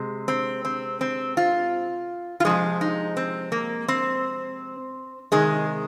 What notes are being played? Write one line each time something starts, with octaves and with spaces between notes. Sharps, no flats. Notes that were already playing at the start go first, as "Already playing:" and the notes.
Already playing: C3 G#3
C4
C4
C4
F4
F4
C3 F3 G#3 G#4
D#4
C4
A#3
C4
C3 D#3 G#3 G#4